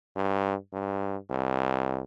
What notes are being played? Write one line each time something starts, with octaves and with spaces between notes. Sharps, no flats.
G2
G2
C2